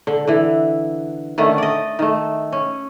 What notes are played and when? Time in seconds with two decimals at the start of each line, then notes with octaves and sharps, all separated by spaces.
0.07 D3
0.27 D3 E3
1.38 D3 D#3 A3 C#4
1.58 D5 D#5
1.99 D#3 A3
2.52 C#4